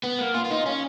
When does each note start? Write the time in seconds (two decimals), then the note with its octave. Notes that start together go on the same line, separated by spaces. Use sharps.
0.03 B3
0.19 A#3
0.34 F4
0.44 F4
0.51 D#4
0.66 C#4